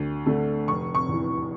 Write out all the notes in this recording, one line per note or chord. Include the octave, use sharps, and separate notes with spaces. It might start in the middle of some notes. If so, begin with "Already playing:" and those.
Already playing: D2
D3 A3
F1 C#6
C#6
E2 E3